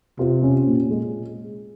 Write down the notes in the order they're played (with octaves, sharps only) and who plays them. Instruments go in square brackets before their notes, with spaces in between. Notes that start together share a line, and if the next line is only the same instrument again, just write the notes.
[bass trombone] C3 [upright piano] F4
[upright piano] C#4
A#2
G#3